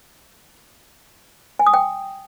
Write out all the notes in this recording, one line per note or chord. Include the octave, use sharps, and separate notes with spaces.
G#5
D#6
G5